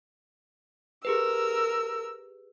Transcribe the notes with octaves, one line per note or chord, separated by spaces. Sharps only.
G4 G#4 A#4 B4 E6